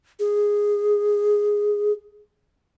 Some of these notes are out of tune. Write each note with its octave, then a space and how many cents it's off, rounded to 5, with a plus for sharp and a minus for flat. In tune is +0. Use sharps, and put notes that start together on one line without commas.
G#4 -5